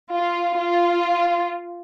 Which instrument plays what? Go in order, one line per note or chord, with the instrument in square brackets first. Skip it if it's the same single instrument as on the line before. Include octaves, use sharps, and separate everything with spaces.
[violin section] F4
F4